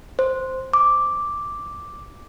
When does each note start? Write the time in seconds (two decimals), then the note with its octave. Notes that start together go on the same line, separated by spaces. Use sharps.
0.19 C5
0.73 D6